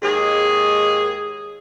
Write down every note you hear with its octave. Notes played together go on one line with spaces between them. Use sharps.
D#2 G#3 G#4